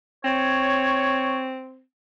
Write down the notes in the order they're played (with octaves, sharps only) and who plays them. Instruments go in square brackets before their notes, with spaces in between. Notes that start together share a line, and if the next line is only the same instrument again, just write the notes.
[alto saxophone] C4 [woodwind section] C#5